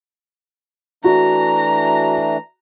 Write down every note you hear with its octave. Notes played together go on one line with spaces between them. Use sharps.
E3 A3 D4 F#4 A#5